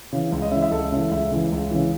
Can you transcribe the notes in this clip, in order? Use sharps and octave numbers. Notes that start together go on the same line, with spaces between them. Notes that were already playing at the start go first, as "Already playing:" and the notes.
C#3 E3
C#2
D#5
C#3 E3 E5
E5
C#2 A4
C#3 E3 E5
C#2 E5
C#3 E3
C#2
C#3 E3